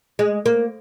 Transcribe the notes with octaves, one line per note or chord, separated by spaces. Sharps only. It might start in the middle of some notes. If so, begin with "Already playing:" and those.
G#3
A#3